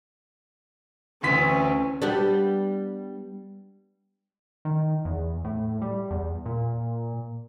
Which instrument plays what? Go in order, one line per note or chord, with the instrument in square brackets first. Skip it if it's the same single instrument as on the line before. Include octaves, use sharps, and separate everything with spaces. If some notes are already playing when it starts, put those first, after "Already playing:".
[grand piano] D2 E3 B6 [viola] C4 C#4
[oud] G3 B3 D4
[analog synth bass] D#3
E2
A2
G3
E2
A#2